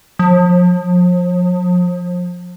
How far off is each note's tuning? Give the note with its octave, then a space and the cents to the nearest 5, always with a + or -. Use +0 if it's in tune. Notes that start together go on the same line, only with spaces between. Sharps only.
F3 +40